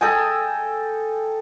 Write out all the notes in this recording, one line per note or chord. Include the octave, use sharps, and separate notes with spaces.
A4 D#5 G5 G#5